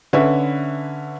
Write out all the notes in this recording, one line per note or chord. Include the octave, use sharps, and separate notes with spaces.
D3 C#4 B4 E5